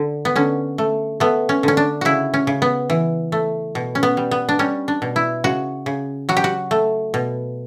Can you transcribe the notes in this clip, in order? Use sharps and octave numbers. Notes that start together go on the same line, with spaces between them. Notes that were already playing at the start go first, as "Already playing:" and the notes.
Already playing: D3
B3
D3 C#4
A3
A3 B3
C#4
D3 C#4
D4
C#3 E4 F#4
C#4
C#3
B3
E3
A3
B2
C#4
B3
G3
B3
D4
G3 C#4
D4
B2
E4
C#3 F#4
C#3
F#3 F#4
G4
F#4
A3
B2